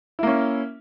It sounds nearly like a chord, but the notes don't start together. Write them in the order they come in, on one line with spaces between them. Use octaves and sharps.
E4 A#3 C#4